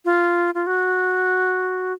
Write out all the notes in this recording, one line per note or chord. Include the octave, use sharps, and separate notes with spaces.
F4
F4
F#4